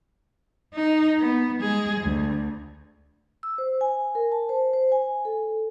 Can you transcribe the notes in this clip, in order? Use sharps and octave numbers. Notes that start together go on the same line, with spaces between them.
D#4
B3
G#3 G#4
D2
E6
C5
G#5
A#4
A5
C5
C5
G#5
A4